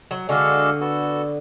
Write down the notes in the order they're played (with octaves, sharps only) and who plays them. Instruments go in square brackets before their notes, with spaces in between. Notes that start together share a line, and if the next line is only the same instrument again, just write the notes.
[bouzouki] F#3
[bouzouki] D3 [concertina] G#3 D4 F#4 A4 F5
[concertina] B3 F#4 A4